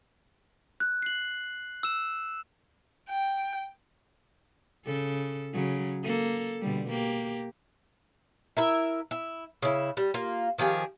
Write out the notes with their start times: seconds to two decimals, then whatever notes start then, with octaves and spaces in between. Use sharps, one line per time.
0.80 F#6
1.02 C7 F#7
1.83 E6 E7
3.10 G5
4.85 C#3 A4
5.53 C#3 F#3
6.03 A#3 A4
6.61 B2 D3 G3
6.90 A#3 G4
8.57 E4 A#4 E5
9.11 E4
9.62 C#3 E4
9.97 G3
10.14 A#3 F4
10.58 D#3 F3 G4 G#4